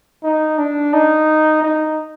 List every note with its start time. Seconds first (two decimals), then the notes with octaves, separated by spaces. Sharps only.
0.23 D#4
0.58 D4
0.93 D#4
1.62 D#4